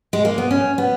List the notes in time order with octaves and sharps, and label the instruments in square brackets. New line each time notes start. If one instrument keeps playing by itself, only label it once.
[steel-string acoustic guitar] G#3
A#3
B3
C#4
B3